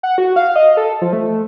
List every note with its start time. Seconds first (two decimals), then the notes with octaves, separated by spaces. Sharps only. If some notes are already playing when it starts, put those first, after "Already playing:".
0.03 F#5
0.18 F#4
0.36 F5
0.56 D#5
0.77 A4
1.01 F3
1.13 A3